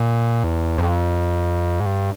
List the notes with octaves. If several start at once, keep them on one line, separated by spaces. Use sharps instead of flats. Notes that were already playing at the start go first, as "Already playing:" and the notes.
Already playing: A#2
E2
F2
G#2
G2